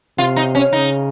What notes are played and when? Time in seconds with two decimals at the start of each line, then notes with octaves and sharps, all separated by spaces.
0.18 C3 F4
0.36 D#4
0.55 C#4
0.72 C#3 D#4